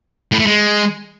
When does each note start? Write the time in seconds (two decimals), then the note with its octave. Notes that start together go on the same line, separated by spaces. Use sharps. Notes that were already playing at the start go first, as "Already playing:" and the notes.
0.32 A2
0.39 A3
0.47 G#3